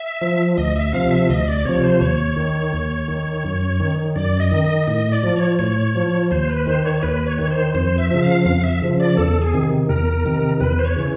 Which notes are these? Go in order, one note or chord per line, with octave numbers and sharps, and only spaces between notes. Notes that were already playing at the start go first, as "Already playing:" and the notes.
Already playing: E5
F3
D2 D#5
E5
C3 F3 F5
E5
D2 D#5
D5
C3 F3 C#5
C5
D#2 C#5
D#3
D#2
D#3
F#2
D#3
F#2 D5
D#5
D#3
D#5
A2 D#5
D5
F3
C#5
A2 C#5
F3
D#2 C5
B4
D#3 C5
C#5
D#2 B4
C#5
D#3
C5
F2 C5
E5
C#3 F3
F5
F2 F5
E5
C#3 F3
D5
E2 A4
G#4
C3 D#3
E2 A#4
C3 D#3
E2 B4
C5
C#5
C#3 E3